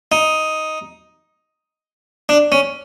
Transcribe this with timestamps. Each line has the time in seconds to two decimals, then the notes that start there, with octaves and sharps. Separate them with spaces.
0.12 D#4
2.29 D4
2.52 C#4